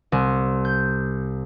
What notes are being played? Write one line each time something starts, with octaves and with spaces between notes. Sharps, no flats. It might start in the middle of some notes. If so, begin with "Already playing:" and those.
C2
G6